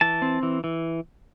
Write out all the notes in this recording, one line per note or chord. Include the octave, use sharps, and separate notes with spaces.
E3 A5
C4
E3
E3